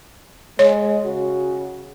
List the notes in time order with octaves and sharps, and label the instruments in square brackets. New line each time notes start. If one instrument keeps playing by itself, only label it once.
[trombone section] G#3 [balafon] C#5
[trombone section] C#3 F#4